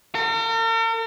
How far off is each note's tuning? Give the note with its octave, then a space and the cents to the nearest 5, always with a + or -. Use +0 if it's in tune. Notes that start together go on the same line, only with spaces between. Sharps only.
A#4 -45